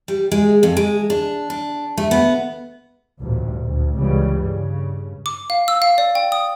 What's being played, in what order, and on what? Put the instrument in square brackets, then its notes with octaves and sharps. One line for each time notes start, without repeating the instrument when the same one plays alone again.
[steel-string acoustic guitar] G3
G#3
F2
G#3
D4
D4
A3
B3
[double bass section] A1 D2 G2 A#2
D2
C#2 C#3 E3 G3
G2 C#3
[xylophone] D6
F5
E6
F5
D5
G5
D#6